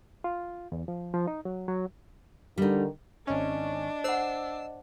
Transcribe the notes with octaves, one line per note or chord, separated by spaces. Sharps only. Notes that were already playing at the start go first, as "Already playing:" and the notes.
F4
E2
F3
F3
D#4
F#3
F#3
D3 D#3 G3 D#4
G#1 C#4 D4 D#5
C5 F#5 E6 C7